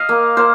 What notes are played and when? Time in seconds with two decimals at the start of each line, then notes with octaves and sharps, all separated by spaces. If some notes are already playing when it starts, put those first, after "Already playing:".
Already playing: D#5 F5
0.09 A#3
0.37 A#3 C5